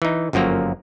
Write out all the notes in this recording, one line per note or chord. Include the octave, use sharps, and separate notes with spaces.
E3 D#4
G1 F#2 F3 F#3 A#3 A#5